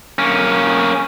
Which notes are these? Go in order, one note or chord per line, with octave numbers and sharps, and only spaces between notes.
A#3 C#4